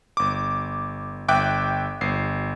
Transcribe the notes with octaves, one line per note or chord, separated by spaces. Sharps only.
G1 D6
G1 E5 G5 D6 F#6 D7
G1 C7